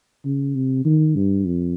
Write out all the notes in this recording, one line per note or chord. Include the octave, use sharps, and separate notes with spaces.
C#3
C3
D#3
G2
F2